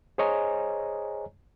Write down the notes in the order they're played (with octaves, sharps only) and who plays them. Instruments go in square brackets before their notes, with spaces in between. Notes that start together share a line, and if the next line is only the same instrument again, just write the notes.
[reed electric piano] G#4 C5 C#5 D#5 G#5 A#5